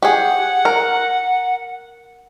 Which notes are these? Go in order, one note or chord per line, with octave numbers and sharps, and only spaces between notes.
G4 G#4 F#5
A#4